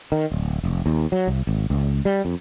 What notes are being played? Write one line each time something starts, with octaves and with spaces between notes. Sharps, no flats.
D#3
D1
F1
D#2
F#3
C2
G#1
C#2
G3
F2